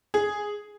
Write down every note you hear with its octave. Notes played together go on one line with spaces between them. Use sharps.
G#4